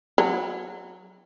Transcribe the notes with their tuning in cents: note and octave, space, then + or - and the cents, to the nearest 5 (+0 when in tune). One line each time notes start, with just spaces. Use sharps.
F#3 -10